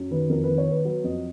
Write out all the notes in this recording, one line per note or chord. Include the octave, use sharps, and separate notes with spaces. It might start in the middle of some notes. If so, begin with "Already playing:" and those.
Already playing: F#2
D#3 B4
F2 A#4
D#3 B4
C#5
B3
B4
F#3 B4
F2 D#5